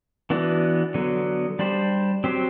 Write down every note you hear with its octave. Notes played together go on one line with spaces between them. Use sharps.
E3 B3 D4 F#4
D3 F#3 B3
G3 D4 G4 C5
F#3 C4 G4 C5